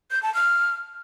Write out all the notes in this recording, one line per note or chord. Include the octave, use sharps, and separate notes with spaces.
G6
A5
F6